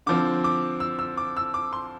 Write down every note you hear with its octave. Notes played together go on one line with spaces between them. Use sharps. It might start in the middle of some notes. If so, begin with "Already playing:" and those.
D3 F3 C4 D6
D6
E6
E6
D6
E6
D6
C6